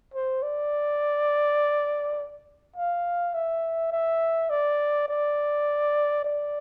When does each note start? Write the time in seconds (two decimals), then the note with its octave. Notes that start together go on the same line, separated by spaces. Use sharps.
0.14 C5
0.42 D5
2.76 F5
3.34 E5
3.92 E5
4.50 D5
5.08 D5
6.25 D5